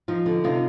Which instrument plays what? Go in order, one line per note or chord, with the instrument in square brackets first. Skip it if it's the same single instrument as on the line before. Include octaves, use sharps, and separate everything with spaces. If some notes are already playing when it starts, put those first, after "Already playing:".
[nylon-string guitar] F3 D#4 F4
D3
C3 D#4 F4